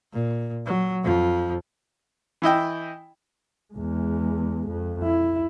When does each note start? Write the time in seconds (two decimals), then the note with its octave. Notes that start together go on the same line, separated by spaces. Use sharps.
0.13 A#2
0.66 F#3
1.03 F2 F3
2.42 E3 E4 D#5 G5
3.74 E2 G#3
4.68 F2
5.03 E4